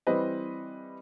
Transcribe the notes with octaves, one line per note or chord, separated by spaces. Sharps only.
E3 G3 C4 B4 C5 D#5